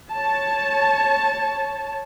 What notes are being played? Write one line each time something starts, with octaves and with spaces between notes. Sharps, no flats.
C#5 A5